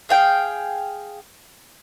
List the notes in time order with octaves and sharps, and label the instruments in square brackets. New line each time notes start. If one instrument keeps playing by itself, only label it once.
[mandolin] G#4 F5 G5